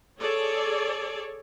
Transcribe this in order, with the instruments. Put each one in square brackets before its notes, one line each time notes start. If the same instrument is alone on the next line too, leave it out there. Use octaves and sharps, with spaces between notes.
[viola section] G#4 A4 C#5 D5